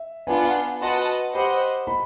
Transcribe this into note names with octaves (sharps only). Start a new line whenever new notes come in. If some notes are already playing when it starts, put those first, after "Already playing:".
Already playing: E5
B3 D4 F4 G#5
F#4 B4 D#5 F#5 A5 C6
G4 C5 D#5 F#5 B5
B5